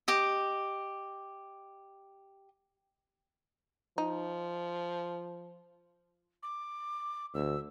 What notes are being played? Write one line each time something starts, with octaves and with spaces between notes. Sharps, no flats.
G4 D#5
F3 D#4
D6
D2 E6